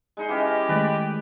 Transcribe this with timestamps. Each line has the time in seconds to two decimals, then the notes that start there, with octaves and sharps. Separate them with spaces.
0.17 G#3 D#4 C6
0.29 E3 C#4 G4 D#5 C6 D6
0.69 D#3 G#3 A3 B4 D5 G#5